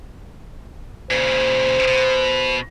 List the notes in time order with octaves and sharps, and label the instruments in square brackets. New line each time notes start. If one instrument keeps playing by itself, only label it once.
[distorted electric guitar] A#2 C#3 [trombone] C5
[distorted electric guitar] B2